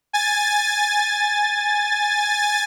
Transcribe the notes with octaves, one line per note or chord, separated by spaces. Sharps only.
G#5 A6